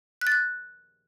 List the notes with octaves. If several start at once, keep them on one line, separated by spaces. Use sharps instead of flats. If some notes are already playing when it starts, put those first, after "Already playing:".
F#6
A6
F#6